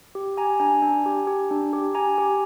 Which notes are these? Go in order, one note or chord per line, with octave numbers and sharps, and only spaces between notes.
G4
G4 G#5 A#5
D4 G#5 A#5
D4
G4
G4
D4
G4
G4 G#5 A#5
G4